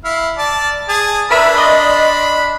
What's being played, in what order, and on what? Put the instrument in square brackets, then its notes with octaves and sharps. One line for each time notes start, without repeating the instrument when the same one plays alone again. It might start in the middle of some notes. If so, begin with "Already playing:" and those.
[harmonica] E4 F5
D5 A5
G#4 A5
[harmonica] D4 B5 [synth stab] A#4 B4 E5
[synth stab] D5 D#5 C6